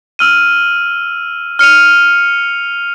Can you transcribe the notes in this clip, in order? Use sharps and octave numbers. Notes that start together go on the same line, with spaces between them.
E6 F6 D#7
F6 C#7 D#7 F7